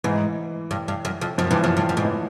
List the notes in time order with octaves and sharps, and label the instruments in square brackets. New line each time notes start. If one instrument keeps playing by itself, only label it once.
[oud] G#2 [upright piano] E3
[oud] G2
G2
F#2
F2
[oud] F#2 [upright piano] F3
[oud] G2 [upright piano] E3
[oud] F#2 [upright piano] F3
[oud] G2
F#2
G#2
[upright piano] E3